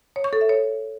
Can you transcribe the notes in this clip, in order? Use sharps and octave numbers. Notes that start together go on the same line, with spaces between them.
C#5
C#6
A4
E5
C#5